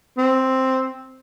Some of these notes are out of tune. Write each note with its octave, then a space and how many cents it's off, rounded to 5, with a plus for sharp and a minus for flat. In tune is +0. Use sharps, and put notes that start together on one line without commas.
C4 +0